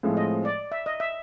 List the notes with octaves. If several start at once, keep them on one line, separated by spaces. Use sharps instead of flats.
A2 F3 G#3 C4
D#5
D5
E5
D#5
E5